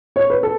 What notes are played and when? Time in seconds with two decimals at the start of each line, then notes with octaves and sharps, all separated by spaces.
0.16 C#5
0.30 B4
0.43 A4